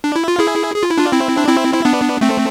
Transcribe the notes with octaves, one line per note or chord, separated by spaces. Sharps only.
D4
E4
F4
E4 G#4
G#4
F4
E4
D4 F4
C4 E4
D4
C4 E4
E4
B3 D4
A3 C4